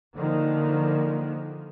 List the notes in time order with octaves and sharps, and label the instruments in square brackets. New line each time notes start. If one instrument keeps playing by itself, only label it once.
[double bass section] D3 D#3 F3 A#3